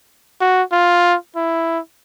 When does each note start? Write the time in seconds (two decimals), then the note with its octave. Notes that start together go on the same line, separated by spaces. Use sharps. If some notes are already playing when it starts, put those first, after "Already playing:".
0.41 F#4
0.72 F4
1.35 E4